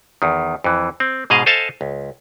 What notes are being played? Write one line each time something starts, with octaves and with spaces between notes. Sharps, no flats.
E2 D#3
F2 E3
C4
G#2 B2 G#4 D#5 F5
A4 C5 D#5 F5 G#5 A5
C#2